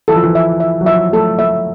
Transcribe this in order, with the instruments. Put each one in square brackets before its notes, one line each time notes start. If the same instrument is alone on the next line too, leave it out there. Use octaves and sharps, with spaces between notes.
[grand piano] E3 [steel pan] A4
[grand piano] F3
E3
[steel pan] E5
E5
[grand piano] F#3
[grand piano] F3 [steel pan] E5
[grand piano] A3 [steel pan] A4
[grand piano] A3 [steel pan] E5